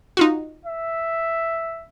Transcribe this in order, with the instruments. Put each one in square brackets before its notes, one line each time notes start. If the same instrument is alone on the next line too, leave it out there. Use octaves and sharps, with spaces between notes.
[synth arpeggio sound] D#4 F4 F#4
[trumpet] E5